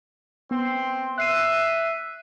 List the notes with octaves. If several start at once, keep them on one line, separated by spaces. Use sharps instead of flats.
B3 C4 C6
E5 F#6 C7 D#7